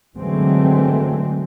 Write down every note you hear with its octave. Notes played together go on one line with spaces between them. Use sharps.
D3 E3 F#3 G#3 A3 C4